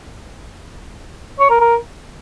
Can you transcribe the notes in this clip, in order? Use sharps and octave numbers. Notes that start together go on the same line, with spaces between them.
C#5
A#4
A#4